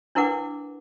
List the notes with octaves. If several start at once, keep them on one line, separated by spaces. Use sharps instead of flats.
D4 E4 A#4 B4 F#5 D6